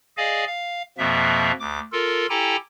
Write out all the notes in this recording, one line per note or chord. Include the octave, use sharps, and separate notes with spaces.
G#4 D5 D#5 F5 G#5
F5
F2 B2 F3 A#3 E5
D2 D6
F4 A4 A#4
E4 G4 A4 G5 G#5 A#5